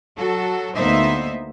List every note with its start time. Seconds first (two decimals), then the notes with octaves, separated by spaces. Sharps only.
0.17 F#3 F#4 A4
0.75 D2 A#3 B3 D#4 C5 E5